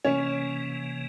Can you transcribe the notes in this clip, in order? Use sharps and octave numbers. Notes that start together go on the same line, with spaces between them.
C3 E3 A#3 C#4